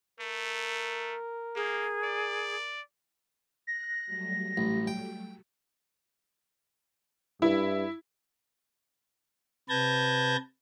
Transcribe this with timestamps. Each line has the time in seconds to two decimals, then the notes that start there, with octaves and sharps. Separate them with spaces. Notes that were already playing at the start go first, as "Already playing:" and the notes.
0.20 A3 A#4
1.56 A#3 G#4
2.02 D5
3.67 F#6 A#6
4.06 F#3 G3 A3
4.57 A1
4.87 G5
7.42 G2 E4
9.69 C3 B4 A5 G6 G#6 A#6